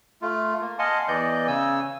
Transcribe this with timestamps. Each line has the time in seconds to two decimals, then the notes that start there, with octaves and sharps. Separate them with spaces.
0.22 A3 F4
0.61 A#3
0.79 D#5 F5 F#5 G#5 A5 C6
1.08 E2 E3 D5 D#5 G6
1.47 C#3 G#5 E6